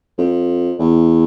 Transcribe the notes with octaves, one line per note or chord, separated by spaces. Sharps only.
F2
E2